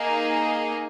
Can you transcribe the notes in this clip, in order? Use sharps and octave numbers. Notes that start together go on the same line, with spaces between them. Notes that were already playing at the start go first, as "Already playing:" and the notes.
Already playing: A#3 D#4 G#4